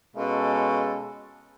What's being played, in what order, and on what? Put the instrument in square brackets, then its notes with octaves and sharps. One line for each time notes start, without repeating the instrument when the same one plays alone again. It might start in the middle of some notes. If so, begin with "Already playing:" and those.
[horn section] B2 G#3 C#4 F4 A4